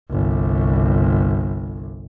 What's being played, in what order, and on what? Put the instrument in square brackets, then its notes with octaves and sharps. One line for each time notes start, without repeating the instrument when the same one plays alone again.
[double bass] G1 C2